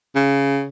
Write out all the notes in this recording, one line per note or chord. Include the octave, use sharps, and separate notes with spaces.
C#3